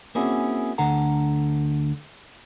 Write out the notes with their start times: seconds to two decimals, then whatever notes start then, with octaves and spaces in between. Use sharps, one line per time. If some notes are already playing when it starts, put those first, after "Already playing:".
0.15 A#3 C4 C#4 E4 F#4 G#4
0.78 D2 D3 D4 A4 F#5 A#5